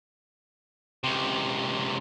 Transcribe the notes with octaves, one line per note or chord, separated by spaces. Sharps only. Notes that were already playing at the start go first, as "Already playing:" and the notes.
C#2 C3